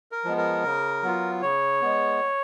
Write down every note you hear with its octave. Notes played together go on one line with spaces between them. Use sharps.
A#4
F3 G#3 B3
A#4
C#3
F#3 B3 F4
C#3 C#5
G#3 B3